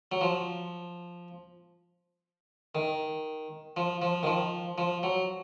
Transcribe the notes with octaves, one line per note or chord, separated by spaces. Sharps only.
F#3
F3
D#3
F3
F3
D#3
F3
F3
F#3